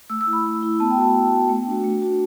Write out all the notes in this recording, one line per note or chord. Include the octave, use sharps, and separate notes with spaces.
A3 E6
E6
E4
B5
A3
E4
B3 A5
G5
F#4 A5
B3
F#4
A3
D4 F#4
A3
D4 F#4